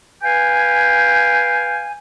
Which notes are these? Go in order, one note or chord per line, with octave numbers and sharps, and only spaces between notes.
B4 F5 G5 G#5